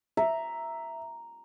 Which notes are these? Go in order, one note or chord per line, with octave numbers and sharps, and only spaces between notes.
E5 A#5